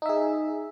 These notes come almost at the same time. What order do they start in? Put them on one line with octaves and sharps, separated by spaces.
D#4 E5 G#4